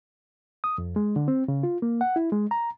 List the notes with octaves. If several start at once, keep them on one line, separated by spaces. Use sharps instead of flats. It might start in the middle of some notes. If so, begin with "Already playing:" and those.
D#6
F2
G#3
D3
C4
C#3
F4
A#3
F#5
E4
G#3
A#5